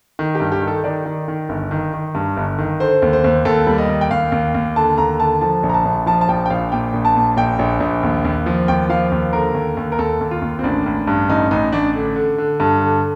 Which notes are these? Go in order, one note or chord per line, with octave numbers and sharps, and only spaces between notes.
D#3
G4
G2
G4
D#3
A4
D#3 D5
D#3
D#3
G1
D#3
D#3
G2
G1
D#3
D3 C5
D#2
C5
D#2
D#2 A4
G3
D#5
D#2
G5
D#2 F5
D#2
D#2
D3 A5
D#2 A#5
D3 A5
F3 A5
A#1
A#5
A5
A#1
F3 A5
A5
A#1 G5
G5
A#1 F5
A#2 G5
A#1
A5
A#2
A#1 G5
A#1
A#1
D#2
D#2
F3
D#2 G5
F3 F5
D#2
D3 A#4
D#2
D#2
A#4
D#2 A4
D#2
F4
D#2
C4
A1 D4
A1
G2
A1 D#4
A1 D#4
A1 D4
D3
D3
D3
G2
D3